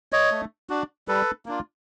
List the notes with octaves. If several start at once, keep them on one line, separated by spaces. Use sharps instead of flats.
C#5 D#5
A3
D4 F#4
G3 A4 B4
A#3 D4 F4